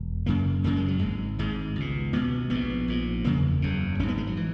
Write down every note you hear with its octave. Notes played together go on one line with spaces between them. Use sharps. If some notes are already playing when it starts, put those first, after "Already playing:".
Already playing: E1
F#1 F#2 C#3 A#3
F#1 F#2 C#3 A#3
G#3
F#3
G#1 G#2 G#3
G#1 G#2 G#3
C#2 B2
C#2 B2 B3
A#1 G#2 B3
A#1 G#2
F#1 E2 C#3 A#3
F#1 E2 C#3
G#1 G#2 C#4
B3
G#3
F#3
E3